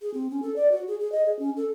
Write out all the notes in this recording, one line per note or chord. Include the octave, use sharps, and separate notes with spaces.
G#4
C4
C#4
A4
D5
F#4
G#4
G#4
D#5
G#4
C#4
A4